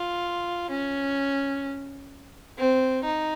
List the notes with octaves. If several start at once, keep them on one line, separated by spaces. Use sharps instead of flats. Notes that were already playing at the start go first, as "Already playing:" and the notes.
Already playing: F4
C#4
C4
D#4